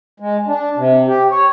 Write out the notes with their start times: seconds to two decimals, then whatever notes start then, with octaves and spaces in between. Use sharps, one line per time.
0.20 G#3
0.47 D4
0.77 C3
1.07 G4
1.31 C#5